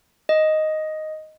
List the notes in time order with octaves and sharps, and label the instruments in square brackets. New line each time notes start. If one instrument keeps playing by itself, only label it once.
[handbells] D#5